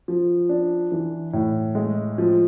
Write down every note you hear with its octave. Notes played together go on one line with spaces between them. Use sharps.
F3
D4
E3
A2
G#3
F3